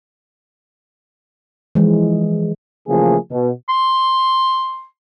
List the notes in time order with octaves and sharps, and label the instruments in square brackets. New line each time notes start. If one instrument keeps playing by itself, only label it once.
[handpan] E3 F3 G#3
[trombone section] C#3 E3 F3 A3 A#3 G#4
B2
[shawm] C6